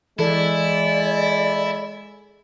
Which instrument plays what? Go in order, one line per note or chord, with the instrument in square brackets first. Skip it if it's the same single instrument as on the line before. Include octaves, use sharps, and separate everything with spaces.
[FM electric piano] E3 A4 [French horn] G#3 [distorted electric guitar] E4 [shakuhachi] D5